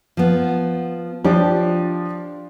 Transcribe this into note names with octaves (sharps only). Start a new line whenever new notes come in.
F3 B3
F3 D4 F4 G4